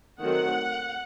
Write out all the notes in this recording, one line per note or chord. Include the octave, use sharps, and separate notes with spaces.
D#3 F#3 A3 C4 F#5